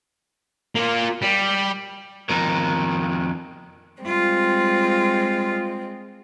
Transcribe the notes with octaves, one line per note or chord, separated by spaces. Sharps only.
A#3 F4
G3
F2 D#3
G3 G#3 C4 F4